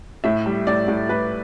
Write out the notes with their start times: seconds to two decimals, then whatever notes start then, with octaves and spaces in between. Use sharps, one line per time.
0.24 A2 E5
0.46 G3
0.67 A2 D5
0.88 A2
1.09 A2 B4